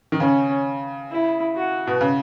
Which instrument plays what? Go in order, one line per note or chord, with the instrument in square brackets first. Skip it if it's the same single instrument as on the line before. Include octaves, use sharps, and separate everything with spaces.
[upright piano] D#3
[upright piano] C#3 [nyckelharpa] C#4
[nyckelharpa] E4
F#4
[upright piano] B2
C#3